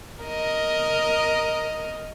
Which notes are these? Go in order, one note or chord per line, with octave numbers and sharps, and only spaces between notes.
A#4 D#5